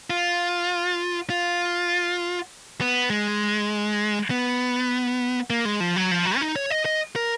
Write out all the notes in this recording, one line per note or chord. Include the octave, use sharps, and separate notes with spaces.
F4
F4
B3
G#3
B3
A#3
G#3
F3
F#3
F3
F#3
C#4
D#4
C#5
D#5
D#5
A#4